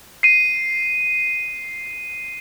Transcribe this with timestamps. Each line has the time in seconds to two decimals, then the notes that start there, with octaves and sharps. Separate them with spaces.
0.23 C7 D#7